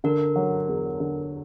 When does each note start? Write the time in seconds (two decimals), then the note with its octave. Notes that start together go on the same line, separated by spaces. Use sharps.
0.04 D3 A#4
0.36 F#3
0.68 E2
1.00 D3